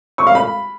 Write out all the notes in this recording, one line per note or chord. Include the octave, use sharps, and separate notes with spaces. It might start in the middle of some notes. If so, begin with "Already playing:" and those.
C#6
F5
B5